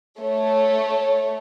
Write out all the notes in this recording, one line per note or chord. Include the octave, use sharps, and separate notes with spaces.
A3 C#5